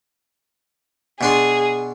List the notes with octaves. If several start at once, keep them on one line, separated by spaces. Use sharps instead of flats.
B2 D4 G#4 C6